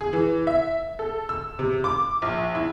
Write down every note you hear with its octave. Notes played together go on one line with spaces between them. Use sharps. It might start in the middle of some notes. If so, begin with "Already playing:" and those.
G#4
E3
E5
A4
E6
C3
D6
A#1
E4